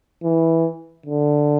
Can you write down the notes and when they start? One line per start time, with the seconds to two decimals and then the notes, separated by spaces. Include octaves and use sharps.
0.24 E3
1.06 D3